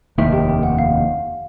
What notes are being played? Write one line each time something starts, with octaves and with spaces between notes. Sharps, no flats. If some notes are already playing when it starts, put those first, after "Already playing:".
F1 D#2 D#3 E5
G4 G5
G4 G5
F#5
F5